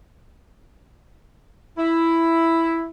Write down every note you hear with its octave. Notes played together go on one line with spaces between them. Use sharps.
E4